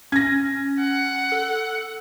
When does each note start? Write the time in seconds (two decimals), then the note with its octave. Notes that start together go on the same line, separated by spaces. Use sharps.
0.12 C#4 G#6 A#6
0.80 F#5
1.32 A4